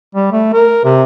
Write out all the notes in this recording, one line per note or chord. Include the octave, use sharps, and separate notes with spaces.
G3
A3
A#4
C3